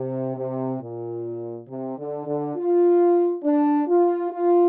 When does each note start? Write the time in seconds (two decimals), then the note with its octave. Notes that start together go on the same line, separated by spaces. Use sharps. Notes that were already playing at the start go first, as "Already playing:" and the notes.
Already playing: C3
0.36 C3
0.81 A#2
1.68 C3
1.98 D3
2.26 D3
2.56 F4
3.44 D4
3.88 F4
4.31 F4